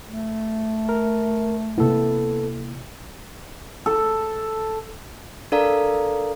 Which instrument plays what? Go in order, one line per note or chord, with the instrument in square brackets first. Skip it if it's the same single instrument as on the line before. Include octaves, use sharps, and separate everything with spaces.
[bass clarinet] A3
[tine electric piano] A#4
[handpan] C3 A#3 E4 [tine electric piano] B3 A4
[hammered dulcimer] A4
[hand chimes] D4 A4 A#4 D5 F5 A#5